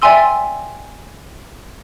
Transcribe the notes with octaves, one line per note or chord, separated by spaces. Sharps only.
D5 E5 G5 G#5 C6 E6